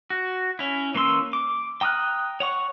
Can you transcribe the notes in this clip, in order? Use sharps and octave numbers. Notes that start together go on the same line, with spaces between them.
F#4
C#4 E4
E3 A#3 C#4 C6 E6
D6
G5 A#5 D#6 F6 F#6
C#5 F#5 C#6